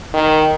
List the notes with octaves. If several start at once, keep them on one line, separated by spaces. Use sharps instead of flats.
D#3